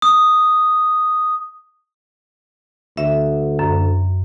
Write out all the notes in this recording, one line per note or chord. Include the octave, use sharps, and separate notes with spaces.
D#6
D2 E5
F#2